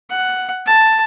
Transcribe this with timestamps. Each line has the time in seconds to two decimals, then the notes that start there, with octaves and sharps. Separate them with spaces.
0.10 F#5
0.66 A5